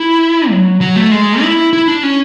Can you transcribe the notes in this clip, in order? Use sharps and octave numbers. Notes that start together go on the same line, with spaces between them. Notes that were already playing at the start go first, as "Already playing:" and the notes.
Already playing: E4
F#3
F#3
A3
G#3
E4
E4
D4
C#4